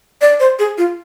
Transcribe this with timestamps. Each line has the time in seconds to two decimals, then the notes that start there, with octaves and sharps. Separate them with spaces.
0.21 D5
0.40 C5
0.59 G#4
0.78 F4